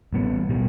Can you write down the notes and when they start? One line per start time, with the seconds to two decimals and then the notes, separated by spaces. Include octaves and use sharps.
0.13 A1 A2 G3 B3
0.49 B2 G3